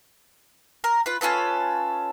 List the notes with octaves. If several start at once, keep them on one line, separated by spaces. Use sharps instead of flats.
A#4
F4 B4
C#4 F4 A4 B4